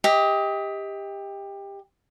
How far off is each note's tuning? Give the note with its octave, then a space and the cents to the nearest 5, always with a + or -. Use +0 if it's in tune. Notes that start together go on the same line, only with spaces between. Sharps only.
G4 +20 D#5 +30